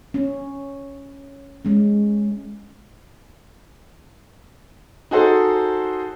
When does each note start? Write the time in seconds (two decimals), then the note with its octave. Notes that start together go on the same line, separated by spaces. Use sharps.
0.14 C#4
1.65 G#3 C#4
5.11 D#4 F#4 G#4 A4 C5